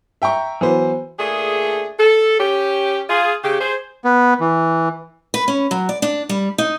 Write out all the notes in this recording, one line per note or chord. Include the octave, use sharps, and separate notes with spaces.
E5 G5 A#5 C#6
E3 F#3 B3 C5
A#2 A3 D4 G#4
A4
C#4 G4
F4 G#4
C#3 G4
G#4 C5
B3
E3
B4
C#4
F#3
D5
D4
G3
D#4